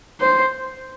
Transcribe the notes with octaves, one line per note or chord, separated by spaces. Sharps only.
C5